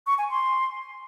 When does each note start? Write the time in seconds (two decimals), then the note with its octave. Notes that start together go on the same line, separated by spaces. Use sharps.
0.07 C#6
0.18 G#5
0.30 C6